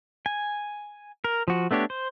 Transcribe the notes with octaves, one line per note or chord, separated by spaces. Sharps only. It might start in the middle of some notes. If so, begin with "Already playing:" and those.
G#5
A#4
F3 F#4
A3 B3 D4 G4 C#5
C5